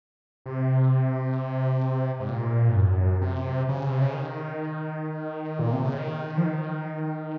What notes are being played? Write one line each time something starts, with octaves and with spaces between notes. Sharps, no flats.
C3
G#2
A#2
G#2
F#2
C3
C#3
C3
C#3
D#3
A#2
C3
C#3
D#3
F3
D#3